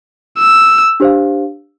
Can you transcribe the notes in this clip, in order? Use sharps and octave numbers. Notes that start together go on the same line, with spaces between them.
E6
D4 G4 C5 F5